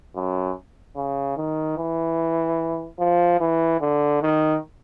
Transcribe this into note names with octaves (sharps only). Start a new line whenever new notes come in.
F#2
C#3
D#3
E3
F3
E3
D3
D#3